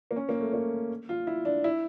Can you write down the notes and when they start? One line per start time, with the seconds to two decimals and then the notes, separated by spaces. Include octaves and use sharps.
0.11 A#3
0.16 C#4
0.29 A#3
0.41 A3
0.53 A#3
1.09 F4
1.27 E4
1.45 D4
1.64 E4